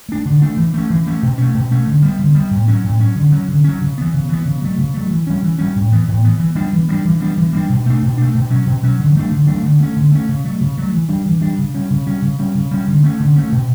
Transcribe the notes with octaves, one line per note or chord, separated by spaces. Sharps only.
A3 D4
D3
A3 D4
E3
A3 C#4
E3
A3 C#4
B2
A3 C#4
B2
A3 C#4
D3
G3 B3
D3
G3 B3
A2
F#3 C#4
A2
F#3 C#4
D3
F#3 C#4
D3
F#3 C#4
C#3
E3 B3
C#3
E3 B3
C#3
F#3 A3
C#3
F#3 A3
E3
G3 C#4
E3
G3 C#4
A2
E3 B3
A2
E3 B3
E3
G3 B3 D4
E3
G3 B3 D4
E3
G3 B3 D4
E3
G3 B3 D4
B2
A3 D4
B2
A3 D4
B2
F#3 C#4
B2
F#3 C#4
D3
F#3 A3 D4
D3
F#3 A3 D4
D3
A3 C#4
D3
A3 C#4
C#3
F#3 A3
C#3
F#3 A3
E3
G3 D4
E3
G3 D4
C#3
G3 C#4
C#3
G3 C#4
C#3
G3 C#4
C#3
G3 C#4
D3
A3 C#4
D3
A3 C#4
B2